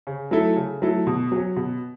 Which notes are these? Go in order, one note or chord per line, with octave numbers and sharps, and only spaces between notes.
C#3
F#3 A3 E4 A4
C#3
F#3 A3 E4 A4
B2
F#3 C#4
B2